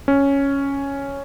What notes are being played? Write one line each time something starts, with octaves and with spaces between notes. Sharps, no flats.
C#4